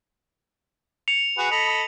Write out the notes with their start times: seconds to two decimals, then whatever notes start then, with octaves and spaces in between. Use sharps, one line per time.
1.08 C#7 F7
1.38 F#4 G#4 B4
1.52 A4 D#5 B5 F7